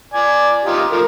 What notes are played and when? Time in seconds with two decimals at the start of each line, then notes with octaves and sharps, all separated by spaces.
0.14 D5 G#5
0.65 D#4 F4 G4
0.92 F3 A3 A#4